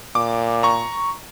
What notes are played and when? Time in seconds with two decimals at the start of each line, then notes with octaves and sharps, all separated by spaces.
0.15 A#2 D6
0.63 A#5 C#6